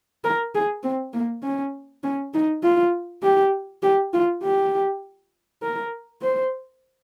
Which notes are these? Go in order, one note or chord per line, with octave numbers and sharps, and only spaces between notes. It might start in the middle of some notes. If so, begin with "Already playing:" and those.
A#4
G#4
C4
A#3
C#4
C#4
D#4
F4
G4
G4
F4
G4
A#4
C5